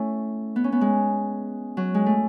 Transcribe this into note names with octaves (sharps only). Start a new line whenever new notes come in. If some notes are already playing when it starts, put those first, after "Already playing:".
Already playing: A3 C#4 E4
B3
C#4
B3
G#3
F#3
G#3
A3